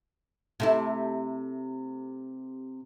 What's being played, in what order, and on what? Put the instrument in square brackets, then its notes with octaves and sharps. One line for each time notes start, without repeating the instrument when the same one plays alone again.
[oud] C3 A3 E4